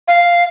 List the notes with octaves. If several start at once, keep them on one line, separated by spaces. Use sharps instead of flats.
F5